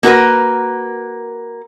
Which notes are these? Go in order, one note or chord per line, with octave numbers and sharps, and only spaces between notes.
A#3 F#4 A#4 B4